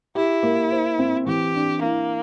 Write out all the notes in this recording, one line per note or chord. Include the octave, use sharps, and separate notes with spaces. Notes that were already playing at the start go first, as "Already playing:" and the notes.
E4 G4
A#3
C5
C4
E3 G4
D4
A#3 E4